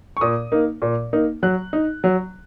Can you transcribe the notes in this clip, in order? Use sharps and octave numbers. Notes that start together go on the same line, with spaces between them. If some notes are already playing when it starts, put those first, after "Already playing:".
C#6
A#2 D#6
A#3 D#4
A#2
A#3 D#4
F#3 F#6
D#4
F#3